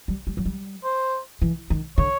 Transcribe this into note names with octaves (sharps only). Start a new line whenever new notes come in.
G3
G3
F#3
G3
C5
E3
D#3
D3 C#5